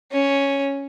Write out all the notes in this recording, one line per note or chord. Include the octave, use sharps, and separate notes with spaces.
C#4